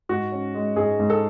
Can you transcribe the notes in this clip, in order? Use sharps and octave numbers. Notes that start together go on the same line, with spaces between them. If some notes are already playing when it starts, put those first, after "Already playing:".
G#2 F#4
C#4
G#3
G#2 G#4
G#2
A4